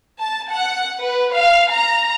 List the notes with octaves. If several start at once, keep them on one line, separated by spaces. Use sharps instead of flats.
A5
F#5
B4
F5
A#5